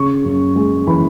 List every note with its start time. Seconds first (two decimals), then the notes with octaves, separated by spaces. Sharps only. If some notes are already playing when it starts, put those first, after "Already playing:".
Already playing: C#3 C#6
0.25 F#2
0.56 G#3
0.87 E3 B5